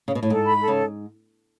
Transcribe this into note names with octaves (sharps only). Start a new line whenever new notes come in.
C#3
B2
A2
G#2 A4
B5
A4
C#3